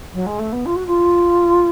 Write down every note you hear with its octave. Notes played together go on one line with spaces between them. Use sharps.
F#3
G#3
A3
B3
F4
F#4
F4